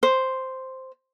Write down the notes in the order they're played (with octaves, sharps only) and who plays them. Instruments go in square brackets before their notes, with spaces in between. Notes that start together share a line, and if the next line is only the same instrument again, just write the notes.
[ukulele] C5